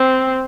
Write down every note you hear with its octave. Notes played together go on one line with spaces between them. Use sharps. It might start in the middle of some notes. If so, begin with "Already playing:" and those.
Already playing: C4